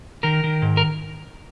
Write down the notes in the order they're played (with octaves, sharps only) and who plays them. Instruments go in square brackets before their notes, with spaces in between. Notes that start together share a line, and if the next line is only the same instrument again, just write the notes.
[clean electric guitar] D#3 A#4
D#3
G#2
A#4